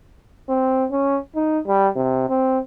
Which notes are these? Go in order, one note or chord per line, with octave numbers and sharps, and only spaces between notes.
C4
C#4
D#4
G3
C3
C4